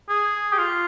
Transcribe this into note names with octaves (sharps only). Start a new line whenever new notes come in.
G#4
G4
F4